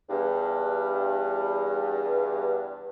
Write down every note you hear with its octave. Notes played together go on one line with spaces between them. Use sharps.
E2 G2